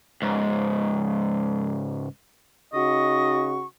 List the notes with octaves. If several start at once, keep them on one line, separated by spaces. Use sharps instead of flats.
C#2 G#2
C#3 D#4 F#4 D#5 C#6